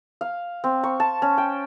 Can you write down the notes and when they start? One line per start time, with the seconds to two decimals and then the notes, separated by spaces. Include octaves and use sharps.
0.21 F5
0.64 C4
0.83 C#6
1.00 A5
1.22 C#4
1.38 G5